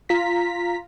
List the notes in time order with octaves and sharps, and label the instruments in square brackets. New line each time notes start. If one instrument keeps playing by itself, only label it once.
[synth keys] F4 A#5 B6